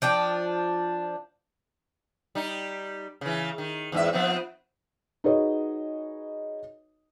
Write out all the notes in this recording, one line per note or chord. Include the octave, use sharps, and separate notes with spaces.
F3 D4 G5
G3 D#4
C#3 E3
D#3
E2 G#2 E5
F3 B3 C4
D#4 F#4 G#4 B4 C#5 D#5